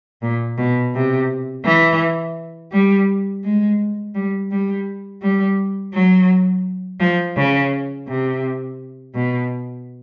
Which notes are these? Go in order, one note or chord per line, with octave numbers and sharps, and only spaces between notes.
A#2
B2
C3
E3
G3
G#3
G3
G3
G3
F#3
F3
C#3
C3
B2